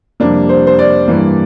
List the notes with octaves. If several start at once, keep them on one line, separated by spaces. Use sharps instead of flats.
F2 C3 G3 A#3 D4
C5
C5
D5
G2 E3 A#3